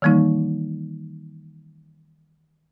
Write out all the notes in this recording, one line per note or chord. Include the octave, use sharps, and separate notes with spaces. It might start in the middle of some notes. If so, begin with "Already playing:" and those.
D#3 E3 G3 A#3 D#4